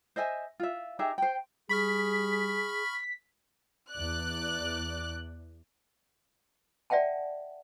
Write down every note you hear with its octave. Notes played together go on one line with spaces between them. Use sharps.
C5 D#5 E5 G#5
F4 E5
D#4 G4 G#4 E5
C5 G5
G3 G#4 B5 C#6 F6 B6
E2 D5 F#6
D5 E5 F#5 G5 A5